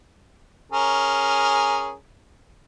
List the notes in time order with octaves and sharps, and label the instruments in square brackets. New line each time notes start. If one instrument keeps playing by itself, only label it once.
[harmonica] C#4 G#4 A#4